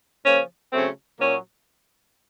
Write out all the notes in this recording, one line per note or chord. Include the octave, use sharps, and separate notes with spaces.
C#3 F3 A#3 C#4
C#3 F#3 A3 C4
A#2 F#3 A#3 C#4